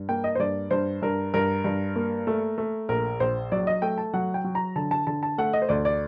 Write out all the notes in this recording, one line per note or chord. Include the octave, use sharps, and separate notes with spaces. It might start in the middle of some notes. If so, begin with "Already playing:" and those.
Already playing: G2
A#3 G5
D#5
C5
G2 D5
G2 C5
G2 A#4
G2 A#4
G2
A#3
A3
A3
A#1 A#4
A#1 C5
F#3 D5
D#5
A3 G5
A5
F#3 F#5
G5
F#3
A#5
D3 A5
A5
D3 A5
A5
A3 F#5
D#5
C5
D2 D5
D5